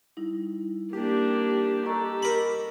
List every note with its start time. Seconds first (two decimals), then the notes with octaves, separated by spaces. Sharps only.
0.17 G3 D#4 E4
0.93 A#3 D4 G4
1.86 A4 D#5 A#5 C#6
2.23 A#4 D#5 B5